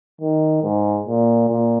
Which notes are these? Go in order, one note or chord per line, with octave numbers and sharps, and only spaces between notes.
D#3
G#2
A#2
A#2